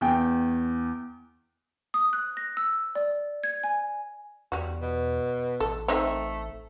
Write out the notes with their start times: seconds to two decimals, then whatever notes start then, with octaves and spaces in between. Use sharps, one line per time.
0.01 E2 G5
1.94 D#6
2.13 F#6
2.37 A#6
2.57 E6
2.95 D5
3.44 G#6
3.64 G#5
4.52 E2 G3 F#4
4.81 B2
5.60 A1 A4
5.88 A3 C4 D#4 E5